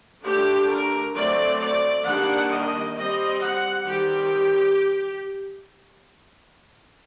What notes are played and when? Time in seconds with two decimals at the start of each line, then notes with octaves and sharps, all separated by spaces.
0.24 D3 A3 D4 G4
0.69 A#4
1.15 F#3 A3 C4 D5
1.60 D5
2.05 D#3 G3 A#3 D4 F#5
2.50 D#5
2.95 G3 C4 D#5
3.40 F#5
3.86 D#3 G3 C4 G4